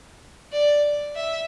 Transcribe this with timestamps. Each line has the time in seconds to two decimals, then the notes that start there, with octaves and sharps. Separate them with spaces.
0.52 D5
1.16 E5